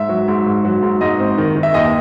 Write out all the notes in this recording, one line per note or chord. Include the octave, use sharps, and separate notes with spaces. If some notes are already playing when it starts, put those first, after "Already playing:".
Already playing: G#2 E5
F#3
G#2
G#2
F#3
G#2
G#2 D#5
C4
D#3
D#3
E5
D#2 D#5